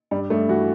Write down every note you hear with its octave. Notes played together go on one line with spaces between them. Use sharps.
G2 G3
G2 A3
E3 F#4